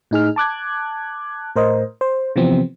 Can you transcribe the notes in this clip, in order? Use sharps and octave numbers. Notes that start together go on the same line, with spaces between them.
A2 D#4 G#4 F6
A5 D6 F#6 G#6
A2 A#4 C5 D#5
C5
C3 E3 F3 B3 C4